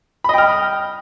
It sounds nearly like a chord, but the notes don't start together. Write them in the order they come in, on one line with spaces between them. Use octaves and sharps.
B5 D#5 G5 F6